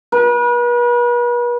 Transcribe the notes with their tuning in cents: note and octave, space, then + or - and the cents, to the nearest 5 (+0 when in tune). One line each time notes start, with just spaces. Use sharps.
B4 -40